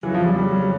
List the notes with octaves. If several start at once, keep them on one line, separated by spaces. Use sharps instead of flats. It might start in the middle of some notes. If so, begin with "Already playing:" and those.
F2 C#3 E3 F#3
F3
G3
G3
G3